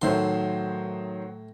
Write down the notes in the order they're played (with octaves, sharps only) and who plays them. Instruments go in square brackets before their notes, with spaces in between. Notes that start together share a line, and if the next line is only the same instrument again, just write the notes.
[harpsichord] A2 E5 C6 [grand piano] D#3 F#3 C5